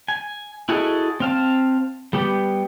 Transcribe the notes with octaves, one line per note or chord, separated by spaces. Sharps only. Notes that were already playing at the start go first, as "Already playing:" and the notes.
G#5
E4 F#4 G#4 A4 D#5
C4 F5 A5
G3 B3 G4